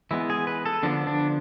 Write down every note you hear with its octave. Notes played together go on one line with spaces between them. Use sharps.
E3 G#3 B3 E4
G#4
B4
A4
D3 F3 B3 D4
D4